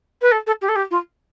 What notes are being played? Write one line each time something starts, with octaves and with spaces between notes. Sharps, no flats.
B4
A4
A4
G4
A4
G4
F4